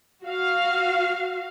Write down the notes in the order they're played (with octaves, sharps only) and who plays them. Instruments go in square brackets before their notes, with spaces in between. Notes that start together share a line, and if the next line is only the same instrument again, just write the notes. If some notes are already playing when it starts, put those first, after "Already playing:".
[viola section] F#4 F5